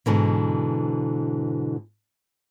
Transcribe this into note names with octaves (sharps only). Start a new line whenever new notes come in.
G#2 B2 D3 E3